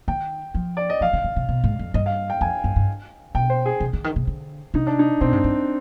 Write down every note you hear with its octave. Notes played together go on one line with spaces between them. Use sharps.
D#3 G5
F3
D5
D#5
F3 F5
D3
D3
C3
B2
G#2
F2
G2 D#5
F5
G5
F2 G#5
G2
G2
B2 G5
C5
G#4
C3
D3
D#3
C3
D3
C3 D#4
D4
D#4
B2 C4
G#2
G2